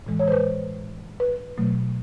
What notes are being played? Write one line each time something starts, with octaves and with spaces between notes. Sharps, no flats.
A2 E3 G#3
C#5
C5
B4
B4
B2 F#3 A3